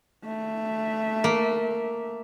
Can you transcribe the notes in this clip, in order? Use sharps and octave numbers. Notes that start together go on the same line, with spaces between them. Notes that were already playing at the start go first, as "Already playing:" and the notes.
A3 E5
A#3